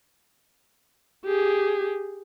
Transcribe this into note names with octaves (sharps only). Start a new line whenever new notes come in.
G4 G#4